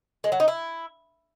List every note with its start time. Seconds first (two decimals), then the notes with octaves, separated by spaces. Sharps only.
0.24 G#3
0.32 F#3
0.40 D#4
0.48 E4